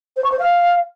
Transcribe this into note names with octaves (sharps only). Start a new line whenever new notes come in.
C5
C#6
C5
F5